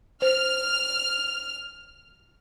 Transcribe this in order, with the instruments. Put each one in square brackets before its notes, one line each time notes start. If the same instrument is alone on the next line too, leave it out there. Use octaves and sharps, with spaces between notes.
[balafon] C5 [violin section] F6